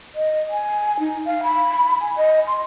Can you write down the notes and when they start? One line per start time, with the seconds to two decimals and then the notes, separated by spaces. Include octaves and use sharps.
0.15 D#5
0.50 G#5
0.99 D#4
1.26 F5
1.43 B5
2.01 G#5
2.17 D#5
2.47 C6